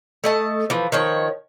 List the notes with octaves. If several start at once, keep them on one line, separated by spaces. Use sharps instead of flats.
A3 D#5 A5
E3 F3
D#3 F3 C#5